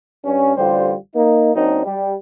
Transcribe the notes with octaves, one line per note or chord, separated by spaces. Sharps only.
G2 C#4
A1 D3 G3 F4 G4 C5
A#3 D#4
F#2 A#3 C4 D4 D#4
G3